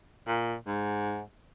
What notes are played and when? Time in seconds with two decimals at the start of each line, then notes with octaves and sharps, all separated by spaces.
0.27 A#2
0.67 G#2